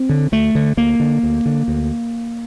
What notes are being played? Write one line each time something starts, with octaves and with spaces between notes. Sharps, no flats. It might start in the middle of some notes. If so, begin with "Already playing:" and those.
Already playing: C4
D3
D2 A3
D3
D2 A#3
D3
D2
D3
D2